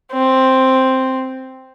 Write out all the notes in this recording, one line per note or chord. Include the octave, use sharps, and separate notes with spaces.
C4